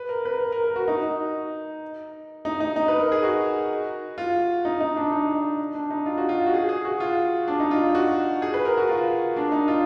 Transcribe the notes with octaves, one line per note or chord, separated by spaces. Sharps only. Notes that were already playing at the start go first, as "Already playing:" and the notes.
Already playing: B4
A#4
B4
A#4
A#4
A#4
F#4
D#4
D#4
D#4
D#4
B4
A#4
G#4
F#4
F4
D#4
D#4
D4
D#4
D4
D#4
F4
F#4
F4
F#4
G#4
G#4
F#4
F4
D4
D#4
F4
F#4
G#4
B4
A#4
F#4
F4
D4
D#4
F4